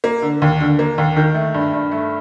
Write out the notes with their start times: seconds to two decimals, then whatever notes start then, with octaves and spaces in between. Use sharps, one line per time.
0.04 A#3
0.22 D3
0.42 D#2
0.60 D3
0.79 A#3
0.98 D#2
1.16 D#3
1.35 A3
1.54 G2
1.73 G2
1.92 A3